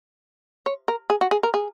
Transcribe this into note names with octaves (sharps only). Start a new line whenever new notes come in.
C#5
A#4
G#4
F#4
G#4
A#4
G#4